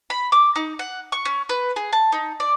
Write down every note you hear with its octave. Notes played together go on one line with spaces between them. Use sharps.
B5
D6
D#4
F#5
C#6
C#4
B4
G#4
A5
D#4
D5